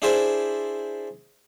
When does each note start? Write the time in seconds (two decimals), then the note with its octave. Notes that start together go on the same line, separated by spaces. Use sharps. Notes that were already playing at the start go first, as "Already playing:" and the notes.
0.02 D4 E4 G#4 C5 D5 E5